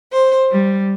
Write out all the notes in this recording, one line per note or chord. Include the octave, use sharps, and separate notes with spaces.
C5
G3